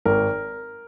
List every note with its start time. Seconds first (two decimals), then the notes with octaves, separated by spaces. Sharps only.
0.05 G#1 A#4